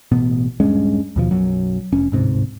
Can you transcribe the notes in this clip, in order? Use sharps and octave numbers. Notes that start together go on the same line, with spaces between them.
A1 B2 B3
D#1 G2 G#3 C#4
D#2 B2 F3
B1 F#2 F#3
F1 C#4
D1 G#2 C3